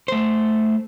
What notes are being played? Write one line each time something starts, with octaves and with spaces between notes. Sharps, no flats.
A3 C5